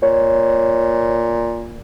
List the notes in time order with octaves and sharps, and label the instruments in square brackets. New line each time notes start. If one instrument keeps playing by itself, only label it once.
[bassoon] A#2 [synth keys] C#5